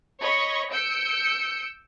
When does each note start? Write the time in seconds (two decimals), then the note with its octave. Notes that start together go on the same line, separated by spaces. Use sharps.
0.20 C#5 D#5 B5 C#6
0.73 E6 G6 C#7 D7